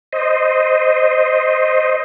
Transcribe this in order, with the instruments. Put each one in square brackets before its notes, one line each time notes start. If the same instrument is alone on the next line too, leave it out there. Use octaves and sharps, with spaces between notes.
[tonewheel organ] C5 D#5